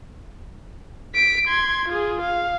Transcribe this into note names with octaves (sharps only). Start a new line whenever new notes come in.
B6 D7
C6 G#6
F4 G#4
F5